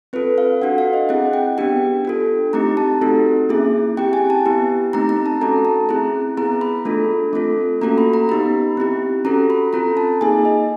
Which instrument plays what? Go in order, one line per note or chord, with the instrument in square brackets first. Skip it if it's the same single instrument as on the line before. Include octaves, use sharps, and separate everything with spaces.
[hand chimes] C4 F4 A4 B4
F5
D4 F#4 A4 F#5
F5
D#5
C4 E4 G#4 F#5
G5
B3 D4 G4 G5
D4 F4 A4
A3 C4 D#4 G4 A#5
A5
C4 D#4 F#4 A4
A#3 C#4 E4 G#4
C4 E4 G4 G5
G#5
A5
B3 E4 G4
A3 C4 D#4 A#5
A#5
A5
A3 C#4 F#4 A4 A#5
A5
C4 E4 G#4 A#5
B3 E4 G#4 A#5
B5
A3 D4 F4 A4
A3 C4 F4 A4
A#3 C#4 F#4 A4 A#5
B5
A#5
B3 D#4 G4 B5
C4 E4 G4
C#4 F#4 A4 A#5
B5
C4 F4 A4 A#5
A5
A#3 D#4 G#4 G#5
D#5